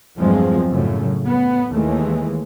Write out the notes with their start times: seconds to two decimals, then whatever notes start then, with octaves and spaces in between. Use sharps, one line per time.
0.17 E2 G2 F3 F#3 G#3 C4
0.72 F#2 A2 C#3
1.25 A1 B3
1.73 D#2 E3 G#3 A3